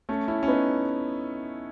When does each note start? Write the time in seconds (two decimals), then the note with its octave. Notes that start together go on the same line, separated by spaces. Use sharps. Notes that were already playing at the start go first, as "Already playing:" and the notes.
0.09 A3 C#4
0.28 C#4 E4
0.43 C#4
0.48 B3 D#4